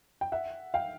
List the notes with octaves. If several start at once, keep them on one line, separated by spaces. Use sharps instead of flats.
G5
E5 F#5
F5 G5